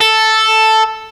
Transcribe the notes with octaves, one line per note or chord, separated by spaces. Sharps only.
A4